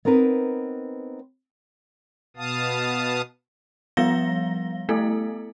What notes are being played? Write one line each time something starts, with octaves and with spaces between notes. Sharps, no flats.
B3 C4 D#4 A#4 B4
B2 B3 F5 A5 D#6
F3 G3 B3 F5 A#6 G7
A3 B3 E4 A4